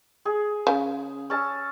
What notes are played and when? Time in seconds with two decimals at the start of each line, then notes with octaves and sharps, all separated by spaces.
0.25 G#4
0.67 C#3
1.30 C#4 A5 E6